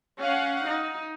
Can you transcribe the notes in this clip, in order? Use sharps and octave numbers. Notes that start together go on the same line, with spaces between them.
C#4 F5 F#5
D#4